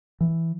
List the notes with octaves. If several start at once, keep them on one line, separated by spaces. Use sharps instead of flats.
E3